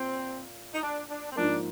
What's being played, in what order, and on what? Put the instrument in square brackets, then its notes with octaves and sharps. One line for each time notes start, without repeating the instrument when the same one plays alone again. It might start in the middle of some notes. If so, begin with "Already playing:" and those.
Already playing: [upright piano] A#2 [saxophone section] C4
[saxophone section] D#4
D4
D4
C4
[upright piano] G#2 F3 A#3 [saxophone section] D4